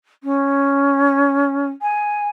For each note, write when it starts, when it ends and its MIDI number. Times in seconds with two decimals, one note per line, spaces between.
0.23 1.68 61
1.81 2.30 80